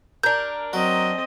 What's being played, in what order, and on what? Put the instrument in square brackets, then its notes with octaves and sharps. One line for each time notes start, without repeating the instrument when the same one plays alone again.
[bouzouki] D4 A#4 [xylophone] G6
[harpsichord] F#3 [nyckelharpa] C4 D#5